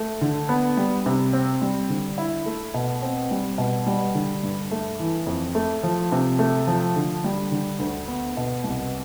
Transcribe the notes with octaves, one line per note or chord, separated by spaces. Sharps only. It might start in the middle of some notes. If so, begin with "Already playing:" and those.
Already playing: A3
D3
B3
G3
C3
C4
G3
D3
E4
A3
B2
C4
G3
B2
G3
D3
G2
A3
E3
F2
A3
F3
C3
A3
F3
D3
G3
D3
D2
B3
B2
C2